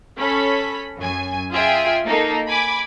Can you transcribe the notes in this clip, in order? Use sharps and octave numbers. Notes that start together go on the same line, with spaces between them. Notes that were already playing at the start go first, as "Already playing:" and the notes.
C#4 A4 B5 B6
F#2 G#5
F4 G#4 E5 G5 G#5
A#3 D#4 A4
G#5 B5 D6 G#6